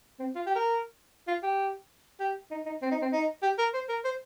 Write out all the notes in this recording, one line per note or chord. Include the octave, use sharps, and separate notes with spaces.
C4
F4
G4
A#4
F4
G4
G4
D#4
D#4
C4
D#4
C4
D#4
G4
A#4
C5
A#4
C5